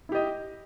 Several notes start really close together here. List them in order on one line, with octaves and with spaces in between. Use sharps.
E4 G4 D#5